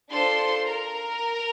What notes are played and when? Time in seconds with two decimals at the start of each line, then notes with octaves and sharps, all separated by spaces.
0.11 D4 F4 A4 C5 C6
0.69 A#4 A#5